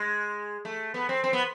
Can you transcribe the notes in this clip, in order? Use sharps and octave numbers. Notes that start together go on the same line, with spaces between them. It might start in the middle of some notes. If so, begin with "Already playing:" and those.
Already playing: G#3
A3
B3
C4
C4
B3